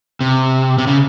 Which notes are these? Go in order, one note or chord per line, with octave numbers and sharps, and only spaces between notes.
C3
C3
C#3